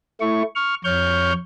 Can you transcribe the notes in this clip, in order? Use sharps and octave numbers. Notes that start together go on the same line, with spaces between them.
A3 E4 C#6
C#6 F6
F2 C#5 C#6 F6 G6